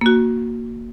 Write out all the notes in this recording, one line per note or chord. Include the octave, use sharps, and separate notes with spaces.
A#3 F#4